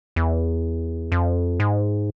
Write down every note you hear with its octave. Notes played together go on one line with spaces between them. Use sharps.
E2
F2
G#2